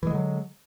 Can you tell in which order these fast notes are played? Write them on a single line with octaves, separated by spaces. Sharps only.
E3 G#3 D3 F#3